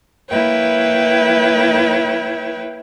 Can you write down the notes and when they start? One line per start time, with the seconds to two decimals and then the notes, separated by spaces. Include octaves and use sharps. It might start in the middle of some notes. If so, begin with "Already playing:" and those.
0.29 A#3 E4 B4 C#5 G5